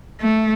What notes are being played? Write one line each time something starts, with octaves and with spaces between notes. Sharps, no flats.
A3